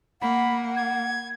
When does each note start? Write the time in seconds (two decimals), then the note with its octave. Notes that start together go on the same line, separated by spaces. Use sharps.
0.21 A#3 F#5 B5
0.76 G#6